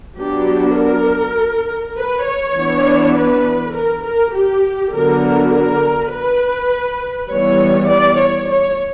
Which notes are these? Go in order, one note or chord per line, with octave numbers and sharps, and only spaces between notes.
F#3 B3 D4 G4
A#4
B4
C#5
E3 B3 D4
B4
A#4
A#4
G4
D3 F#3 B3 D4 A#4
A#4
B4
E3 G3 B3 C#5
D5
C#5
C#5